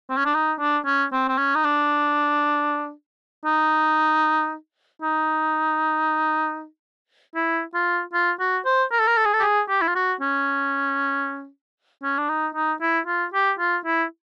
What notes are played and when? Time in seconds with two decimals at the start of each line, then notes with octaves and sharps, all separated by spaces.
0.10 C4
0.17 C#4
0.25 D4
0.35 D#4
0.60 D4
0.86 C#4
1.13 C4
1.29 C4
1.38 C#4
1.55 D#4
1.64 D4
3.45 D#4
5.02 D#4
7.35 E4
7.74 F4
8.13 F4
8.40 F#4
8.65 C5
8.92 A#4
8.99 A4
9.07 A#4
9.17 A4
9.25 G#4
9.34 A4
9.40 G4
9.43 G#4
9.69 G4
9.82 E4
9.88 F4
9.95 F#4
10.21 C#4
12.03 C#4
12.18 D4
12.29 D#4
12.55 D#4
12.81 E4
13.07 F4
13.34 G4
13.59 F4
13.85 E4